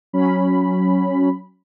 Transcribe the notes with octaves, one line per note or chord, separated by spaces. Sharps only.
F#3 C#4 B5